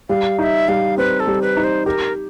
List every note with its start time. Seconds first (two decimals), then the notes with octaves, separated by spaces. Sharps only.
0.09 G3 F5
0.38 D#4 F5
0.43 E5
0.68 G3 F5
0.98 C4 B4
1.20 A4
1.27 G3
1.42 B4
1.57 D#4
1.64 C5
1.86 G4 A#4